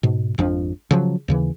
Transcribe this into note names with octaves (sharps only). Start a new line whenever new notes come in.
G#2 B2
G#1 F2 F3 D4
C#3 F3 F#3
D#2 C#3 E3